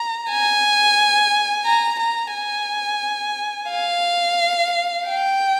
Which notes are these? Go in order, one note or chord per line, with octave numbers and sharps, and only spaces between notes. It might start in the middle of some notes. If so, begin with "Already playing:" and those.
Already playing: A#5
G#5
A#5
A#5
G#5
F5
G5